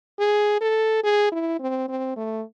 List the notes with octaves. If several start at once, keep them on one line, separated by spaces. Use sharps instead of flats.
G#4
A4
G#4
E4
C4
C4
A3